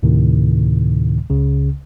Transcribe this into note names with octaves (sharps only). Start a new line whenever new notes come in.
D2 A2 C3 D#3
C#2 C#3